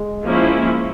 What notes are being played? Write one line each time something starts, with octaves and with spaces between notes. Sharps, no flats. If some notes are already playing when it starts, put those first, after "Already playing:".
Already playing: G#3
F3 A#3 C#4 E4